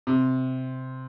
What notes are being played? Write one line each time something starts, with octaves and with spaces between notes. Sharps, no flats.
C3